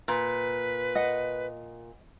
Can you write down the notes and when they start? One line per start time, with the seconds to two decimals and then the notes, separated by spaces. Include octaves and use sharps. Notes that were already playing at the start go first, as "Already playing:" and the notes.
0.08 A#2 B4
0.95 D#5 F#5